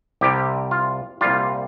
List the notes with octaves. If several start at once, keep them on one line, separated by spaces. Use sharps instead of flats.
C2 C3 G3 G4
F4
C2 A#2 G3 F4